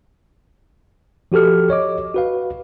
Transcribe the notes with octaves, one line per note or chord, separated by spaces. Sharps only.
F3 F#4 G4 A4 F6
C#5 D#5 D6
F#4 B4 F5